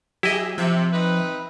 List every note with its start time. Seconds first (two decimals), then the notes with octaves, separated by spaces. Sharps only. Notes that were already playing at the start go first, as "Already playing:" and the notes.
0.23 F#3 E4 G4 G#4 D#5 E5
0.58 C3 F3 E5
0.93 C4 D#4 B4